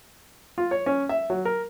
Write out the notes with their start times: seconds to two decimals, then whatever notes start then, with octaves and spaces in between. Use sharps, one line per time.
0.58 F4
0.71 C#5
0.86 C#4
1.09 E5
1.30 F#3
1.45 A#4